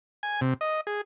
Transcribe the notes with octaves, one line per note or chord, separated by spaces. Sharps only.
G#5
C3
D#5
G#4